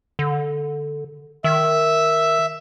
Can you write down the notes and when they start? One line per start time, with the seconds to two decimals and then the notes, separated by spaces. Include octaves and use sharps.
0.19 D3
1.44 D#3 E5